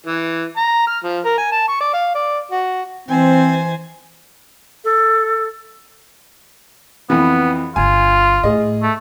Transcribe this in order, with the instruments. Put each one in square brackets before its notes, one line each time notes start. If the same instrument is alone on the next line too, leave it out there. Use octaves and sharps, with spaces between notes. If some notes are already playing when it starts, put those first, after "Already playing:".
[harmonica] E3
A#5
F6
F3
A#4
G#5
A5
C#6
D5
F5
D5
F#4
[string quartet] E3 C5 G#5 [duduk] C4
[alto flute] A4
[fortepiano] F2 E3 [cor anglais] B3
[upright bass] G1 D3 [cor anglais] F4 [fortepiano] G#5
[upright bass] A2 [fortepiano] G#4 D#5
[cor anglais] A3